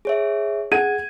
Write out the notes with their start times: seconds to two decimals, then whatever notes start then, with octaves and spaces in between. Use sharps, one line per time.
0.05 G#4 C#5 E5
0.72 G#4 F#5 G#6 D#7